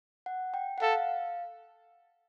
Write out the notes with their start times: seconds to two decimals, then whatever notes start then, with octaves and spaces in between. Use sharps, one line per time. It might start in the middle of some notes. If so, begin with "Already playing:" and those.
0.26 F#5
0.54 G5
0.78 F#5
0.82 A4 F5